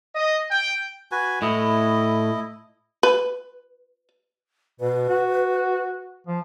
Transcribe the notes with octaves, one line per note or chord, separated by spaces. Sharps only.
D#5
G5
F#4 B4 G#5
A2 E4 D#5
B4
B2 B4
F#4
F3